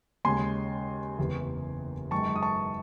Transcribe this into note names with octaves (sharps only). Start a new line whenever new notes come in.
D#2 C#3 G#3 G#5 C6
F#1 E2 C3
F#2 D#3 G#3 A5 C#6
D#6
A5 C#6